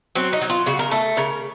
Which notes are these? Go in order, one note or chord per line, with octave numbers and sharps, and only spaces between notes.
F#3 C4
D#4
F#3
F4
C#3 F#4
A#4
A3 A4
C#3 A#4